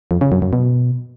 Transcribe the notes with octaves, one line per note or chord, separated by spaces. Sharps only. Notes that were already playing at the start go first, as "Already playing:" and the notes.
F2
C#3
F#2
F#2
B2